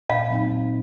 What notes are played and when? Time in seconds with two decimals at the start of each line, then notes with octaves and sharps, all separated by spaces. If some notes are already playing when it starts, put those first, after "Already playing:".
0.10 A#2 F5
0.30 F#3 C4 D#4
0.52 A#2